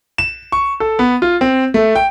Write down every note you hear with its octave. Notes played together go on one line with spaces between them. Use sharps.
E7
C#6
A4
B3
F4
C4
A3
G5